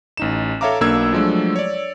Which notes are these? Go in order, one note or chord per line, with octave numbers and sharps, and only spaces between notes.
A1 D#4 E7
A4 C#5 E5 F5 A#5 D6
B1 B2 A#3 D4 E6 G#6
F3 F#3 G#3 A3 D4
C#5 D5